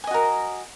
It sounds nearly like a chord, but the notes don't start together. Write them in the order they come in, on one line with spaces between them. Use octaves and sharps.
G#5 D#5 F#4 A#4